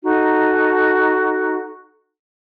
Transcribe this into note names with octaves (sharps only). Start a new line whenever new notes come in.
D#4 F#4 A4